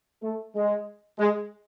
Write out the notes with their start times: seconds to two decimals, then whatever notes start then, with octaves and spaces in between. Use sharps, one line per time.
0.23 A3
0.55 G#3
1.19 G#3